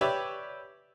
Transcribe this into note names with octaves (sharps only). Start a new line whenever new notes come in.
G4 B4 C#5 D5 E5